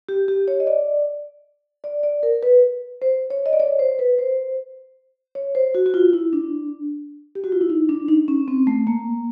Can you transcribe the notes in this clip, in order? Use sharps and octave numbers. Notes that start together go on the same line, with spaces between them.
G4
G4
C#5
D#5
D5
D5
D5
A#4
B4
C5
C#5
D#5
D5
C#5
C5
B4
C5
C#5
C5
F#4
F#4
F4
E4
D4
G4
F#4
F4
E4
D#4
D4
D#4
C#4
C4
A3
A#3